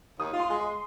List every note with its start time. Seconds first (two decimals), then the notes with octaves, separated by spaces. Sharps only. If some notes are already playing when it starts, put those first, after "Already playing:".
0.19 D#2 D#6
0.34 F4
0.39 C6
0.49 G#3
0.60 C6